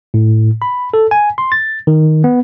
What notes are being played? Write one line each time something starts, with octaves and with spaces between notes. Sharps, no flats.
A2
B5
A4
G#5
C6
A6
D#3
B3